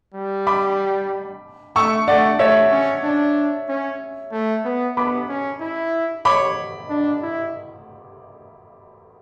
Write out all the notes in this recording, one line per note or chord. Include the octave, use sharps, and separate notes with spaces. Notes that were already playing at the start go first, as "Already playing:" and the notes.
G3
B5 D6
A3 C#6 E6
A3 D5 F#5
A3 C#5 E5
C#4
D4
C#4
A3
B3
B3 B5 D6
C#4
E4
C#5 B5 D6
D4
E4